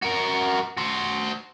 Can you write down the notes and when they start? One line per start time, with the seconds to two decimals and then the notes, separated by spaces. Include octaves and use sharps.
0.03 F#4 A#4
0.77 F#4 C5